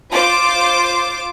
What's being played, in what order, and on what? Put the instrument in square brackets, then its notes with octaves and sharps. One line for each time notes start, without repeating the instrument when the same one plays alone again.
[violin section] F4 C5 D6